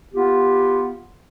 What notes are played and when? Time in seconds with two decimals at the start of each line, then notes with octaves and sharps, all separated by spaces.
0.14 B3 F4 G4